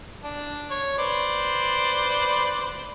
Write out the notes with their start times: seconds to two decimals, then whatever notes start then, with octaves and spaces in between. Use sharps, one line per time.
0.24 D4
0.70 C#5
0.98 B4 C5 D5